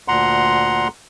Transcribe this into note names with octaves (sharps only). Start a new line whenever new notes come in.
D2 A#2 F#5 A#5 C6